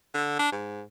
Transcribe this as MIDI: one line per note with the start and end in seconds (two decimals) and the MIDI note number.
0.14 0.34 50
0.39 0.52 62
0.52 0.83 44